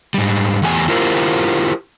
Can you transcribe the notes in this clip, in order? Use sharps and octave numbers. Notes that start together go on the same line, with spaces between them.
G#2 G3
E2 A3 G4 G#5
E4 F4 G4 A#4 C5